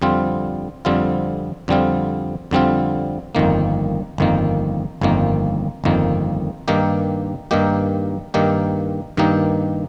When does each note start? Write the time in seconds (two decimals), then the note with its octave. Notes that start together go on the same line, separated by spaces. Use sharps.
0.02 F2 D3 G3 C4 F4
0.85 F2 D3 G3 C4 F4
1.68 F2 D3 G3 C4 F4
2.51 F2 D3 G3 C4 F4
3.35 G1 F2 D#3 A#3
4.18 G1 F2 D#3 A#3
5.01 G1 F2 D#3 A#3
5.84 G1 F2 D#3 A#3
6.68 G2 D#3 A#3 D#4 G4
7.51 G2 D#3 A#3 D#4 G4
8.34 G2 D#3 A#3 D#4 G4
9.17 G2 D#3 A#3 D#4 G4